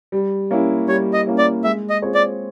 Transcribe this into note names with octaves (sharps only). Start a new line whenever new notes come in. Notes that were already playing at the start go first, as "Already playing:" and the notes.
G3
A#3 C#4 E4
G3 C#5
D#5
A#3 C#4 E4
D5
G#3 E5
D#5
C4 F4 G#4 C#5
D5